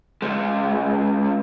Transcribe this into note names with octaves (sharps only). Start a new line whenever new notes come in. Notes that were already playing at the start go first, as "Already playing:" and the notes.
C#2 G#3